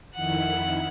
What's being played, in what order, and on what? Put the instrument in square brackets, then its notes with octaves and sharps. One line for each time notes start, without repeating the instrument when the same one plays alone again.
[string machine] F2 D#3 E4 [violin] F#5